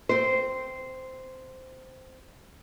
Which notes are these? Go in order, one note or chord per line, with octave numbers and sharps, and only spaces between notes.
C4 C5